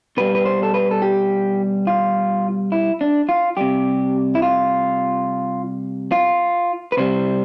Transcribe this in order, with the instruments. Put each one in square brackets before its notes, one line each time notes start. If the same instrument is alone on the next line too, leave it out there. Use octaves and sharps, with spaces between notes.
[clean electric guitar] B2 G3 B4
B4
C5
A4
B4
A4
G4
F4
E4
D4
F4
C3 G3 G4
E4
F4
F4
B4
C3 G3 C5